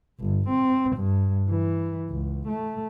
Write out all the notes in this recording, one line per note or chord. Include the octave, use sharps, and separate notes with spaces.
G1
C4
G2
E3
C#2
A3